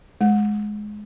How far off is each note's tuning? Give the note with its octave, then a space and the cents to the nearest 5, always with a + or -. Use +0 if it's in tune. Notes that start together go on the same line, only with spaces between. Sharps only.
G#3 +15